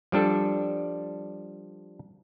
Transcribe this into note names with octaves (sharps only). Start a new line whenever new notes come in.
F3 G3 D4 A4